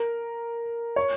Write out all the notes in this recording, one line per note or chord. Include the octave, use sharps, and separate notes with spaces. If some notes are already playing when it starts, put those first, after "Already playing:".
Already playing: A#4
C#5